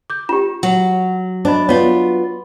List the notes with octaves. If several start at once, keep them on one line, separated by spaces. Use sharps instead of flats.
D6 G6
F4 G4 E7
F#3 F#5
D4 C5 D#5 B5 D6
B3 F4 C#5